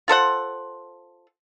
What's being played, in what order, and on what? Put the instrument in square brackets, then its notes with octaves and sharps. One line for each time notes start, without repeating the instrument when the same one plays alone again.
[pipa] F4 A4 C5 F#5